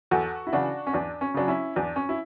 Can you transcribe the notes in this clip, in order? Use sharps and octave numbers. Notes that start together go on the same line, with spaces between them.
E2 F#4 A4
E4
C#3 E3 D4 F#4
C#4
E2 D4
C#4
C#3 F#3 D4
C#4 E4
E2 D4
C#4
E4